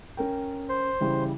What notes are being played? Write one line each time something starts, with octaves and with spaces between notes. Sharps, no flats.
C#4 A#4 G5
C5
C#3 E3 G3